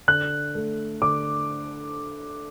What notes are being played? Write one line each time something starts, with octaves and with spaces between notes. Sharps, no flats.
D3 F#6
A3
D3 D6